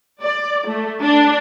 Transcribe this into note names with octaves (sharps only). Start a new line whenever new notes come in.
D5
A3
D4